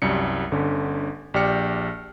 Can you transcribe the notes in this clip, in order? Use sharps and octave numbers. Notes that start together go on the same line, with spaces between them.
C2 F#2 G3 C#7
G1 D3 C#4
A#1 G4 D5 G5 F6 C#7